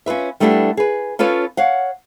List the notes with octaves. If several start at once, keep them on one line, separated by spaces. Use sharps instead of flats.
C#4 F4 B4 E5
G3 A3 B3 D4 E4 G4
G#4 B4
C#4 F4 A4 B4 C#5
C#5 F5 F#5